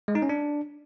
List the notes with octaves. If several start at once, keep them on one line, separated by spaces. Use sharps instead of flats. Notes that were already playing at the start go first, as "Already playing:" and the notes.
G#3
D#4
C#4
D4